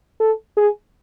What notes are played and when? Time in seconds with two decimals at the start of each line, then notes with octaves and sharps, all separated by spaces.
0.20 A4
0.57 G#4